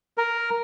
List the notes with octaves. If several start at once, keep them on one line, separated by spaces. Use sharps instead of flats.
A#4